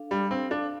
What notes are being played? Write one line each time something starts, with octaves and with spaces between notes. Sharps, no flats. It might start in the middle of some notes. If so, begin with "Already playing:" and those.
Already playing: D4 A4 F5
G3 D4
C4
D4 A4 F5